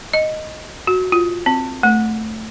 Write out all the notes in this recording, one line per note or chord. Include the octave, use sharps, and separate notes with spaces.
D#5
F#4
F4
C4
A3